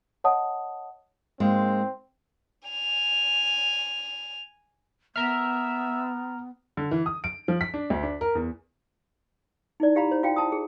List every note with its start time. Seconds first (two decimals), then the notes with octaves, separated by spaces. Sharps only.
0.24 C#5 D#5 F#5 A5 D#6
1.40 G#2 G#3 A#3 C4
2.68 G#5 F7
5.16 B3 E5 A#5 F6
6.77 D3
6.91 E3
7.06 D#6
7.24 D7
7.48 F3
7.61 B6
7.74 D4
7.90 D2
8.03 D4
8.21 A#4
8.35 E2
9.80 D#4 E4 D5
9.95 E4 G4 F5 A#5 B5
10.11 C5
10.23 F4 F#4 F5 G5
10.36 E4 A5 D#6
10.52 G#4